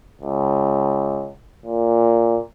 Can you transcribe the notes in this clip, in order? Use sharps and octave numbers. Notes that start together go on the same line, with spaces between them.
C#2
A#2